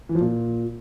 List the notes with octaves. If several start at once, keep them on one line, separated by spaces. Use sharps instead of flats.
E3
F3
A#2